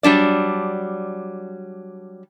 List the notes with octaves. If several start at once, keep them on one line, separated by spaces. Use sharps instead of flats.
F#3 G3 D4 D5